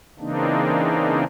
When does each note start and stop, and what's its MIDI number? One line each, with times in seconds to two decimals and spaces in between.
0.19 1.24 49
0.19 1.24 52
0.19 1.24 58
0.19 1.24 60
0.19 1.24 62
0.19 1.24 63